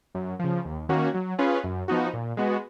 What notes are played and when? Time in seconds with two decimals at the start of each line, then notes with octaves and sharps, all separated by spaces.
0.15 F#2
0.39 C#3 F3
0.65 D#2
0.89 D#3 A#3 C#4 F#4
1.14 F#3
1.38 C#4 F4 G#4 B4
1.64 F#2
1.88 F3 B3 D#4 F#4
2.13 A#2
2.37 G#3 B3 F#4